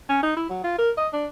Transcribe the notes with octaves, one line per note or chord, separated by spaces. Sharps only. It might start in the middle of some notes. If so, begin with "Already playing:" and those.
C#4
D#4
E4
F#3
F4
A#4
D#5
D4